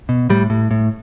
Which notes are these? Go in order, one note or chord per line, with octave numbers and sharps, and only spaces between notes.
B2
A2 G3
A2
A2